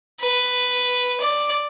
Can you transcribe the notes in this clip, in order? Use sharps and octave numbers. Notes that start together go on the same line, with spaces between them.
B4
D5